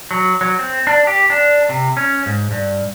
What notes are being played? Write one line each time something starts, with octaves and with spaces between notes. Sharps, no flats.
F#3
F#3
C4
D4
G4
D4
C3
C#4
G#2
G2